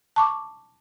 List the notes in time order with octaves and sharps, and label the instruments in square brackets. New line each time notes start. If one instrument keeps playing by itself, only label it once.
[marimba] A5 C#6 D6